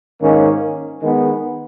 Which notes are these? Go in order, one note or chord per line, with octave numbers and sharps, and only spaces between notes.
G#2 D#3 A#3 C#4
D#3 G#3 B3